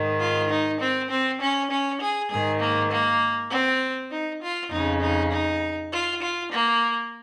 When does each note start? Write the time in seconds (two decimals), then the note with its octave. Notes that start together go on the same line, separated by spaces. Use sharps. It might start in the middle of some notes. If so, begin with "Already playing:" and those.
Already playing: G#2 D#3
0.20 F4
0.50 D#4
0.80 C4
1.10 C4
1.41 C#4
1.70 C#4
2.01 G#4
2.31 G#2 D#3 G#4
2.61 A#3
2.91 A#3
3.51 C4
4.11 D#4
4.42 F4
4.72 F2 C#3 D#4
5.02 D#4
5.32 D#4
5.93 F4
6.22 F4
6.52 A#3